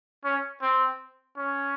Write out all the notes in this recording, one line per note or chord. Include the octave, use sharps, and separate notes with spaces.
C#4
C4
C#4